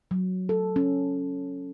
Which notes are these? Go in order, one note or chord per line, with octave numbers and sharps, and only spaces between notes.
F#3
A4
C#4